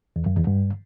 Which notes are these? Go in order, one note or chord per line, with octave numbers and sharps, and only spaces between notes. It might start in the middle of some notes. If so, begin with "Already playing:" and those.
E2
F#2
E2
G2